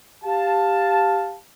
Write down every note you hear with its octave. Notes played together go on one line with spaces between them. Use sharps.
G4 F5 A5